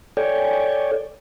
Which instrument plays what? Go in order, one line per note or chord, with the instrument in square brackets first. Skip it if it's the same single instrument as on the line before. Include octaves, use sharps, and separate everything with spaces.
[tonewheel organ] A4 C#5 D5 G5 G#5